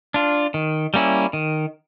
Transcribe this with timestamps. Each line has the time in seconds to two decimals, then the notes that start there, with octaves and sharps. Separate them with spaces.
0.14 D4 F4
0.54 D#3
0.94 G3 A#3 C#4 E4
1.33 D#3